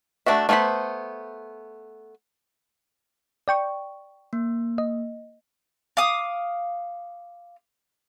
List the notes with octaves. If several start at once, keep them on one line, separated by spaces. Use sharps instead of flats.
A3 C#4 D4 F#4 E5
A3 B3 C5 C#5 B5
D5 G5 C#6
A#3
D#5
F5 D6 D#6